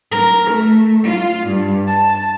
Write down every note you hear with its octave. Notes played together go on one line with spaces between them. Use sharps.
A#4
A3
F4
G2
A5